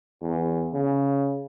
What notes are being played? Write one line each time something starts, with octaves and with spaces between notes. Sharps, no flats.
E2
C#3